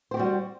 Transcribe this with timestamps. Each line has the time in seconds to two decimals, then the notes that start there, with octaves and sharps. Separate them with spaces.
0.11 C5
0.14 G4
0.17 F#4
0.19 G3